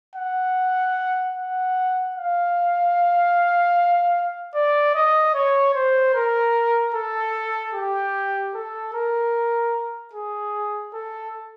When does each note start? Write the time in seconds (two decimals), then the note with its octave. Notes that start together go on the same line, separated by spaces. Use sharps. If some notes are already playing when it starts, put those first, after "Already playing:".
0.16 F#5
1.36 F#5
2.16 F5
4.55 D5
4.94 D#5
5.34 C#5
5.75 C5
6.14 A#4
6.94 A4
7.74 G4
8.54 A4
8.94 A#4
10.13 G#4
10.93 A4